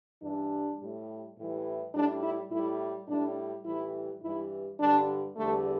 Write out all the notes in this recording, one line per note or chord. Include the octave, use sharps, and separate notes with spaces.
G2 E3 G3 D4
A2 G3
A2 E3 G3
A2 G3 D4
E4
A2 G3 E4
A2 G3 D4
A2 E3 G3 E4
G2 E3 G3 E4
G2 D3 G3 D4
E2 D3 G3 A3